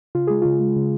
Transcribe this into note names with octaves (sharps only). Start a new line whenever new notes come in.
C#3 F4
G#3 G#4
C#3 F4
G#3
C#3